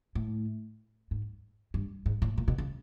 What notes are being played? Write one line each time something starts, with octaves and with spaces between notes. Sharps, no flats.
A2
G#2
G2
G#2
A2
A#2
B2
C#3